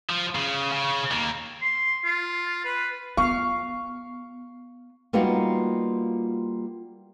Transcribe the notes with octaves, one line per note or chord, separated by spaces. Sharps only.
F3
C#3
C#3
D#3 A#3
C6
F4
B4
B3 F5 C#6
G3 A#3 B3 D#4 F4 F#4